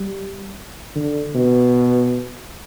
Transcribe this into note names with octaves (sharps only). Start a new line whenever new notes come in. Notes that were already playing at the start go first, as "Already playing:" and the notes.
Already playing: G3
D3
B2